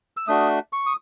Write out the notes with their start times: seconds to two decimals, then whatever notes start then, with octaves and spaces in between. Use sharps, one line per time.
0.17 E6
0.28 A3 D4 F#4 D#6
0.73 C#6
0.86 D#6